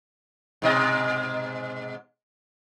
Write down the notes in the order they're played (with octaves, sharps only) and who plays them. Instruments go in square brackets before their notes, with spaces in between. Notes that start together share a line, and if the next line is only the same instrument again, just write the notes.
[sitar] G#2 B2 D#5